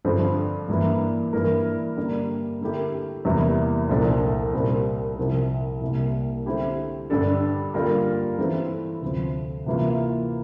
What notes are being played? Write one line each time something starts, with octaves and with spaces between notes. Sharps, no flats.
G2 D3 F3 A3 C4
G2 E3 A#3
G2 E3 A#3 E4 A#4
D3 G3 A#3 D4
D3 A3 E4 G4 A#4
E2 C3 E3 G3 A#3
C2 A#2 F3 A3 D4
C2 A#2 G3 C4
C2 C3 F3 C4
C2 C3 G3 A#3
D3 A3 C4 E4 G4
G2 D3 G3 D4 A4
D3 G3 A#3 F4 A#4
E3 A3 C4 E4
D2 C3 F3 C4
C3 E3 A#3 F4